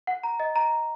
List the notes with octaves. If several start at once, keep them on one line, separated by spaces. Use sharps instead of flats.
F#5
A#5
D#5
A#5
A#5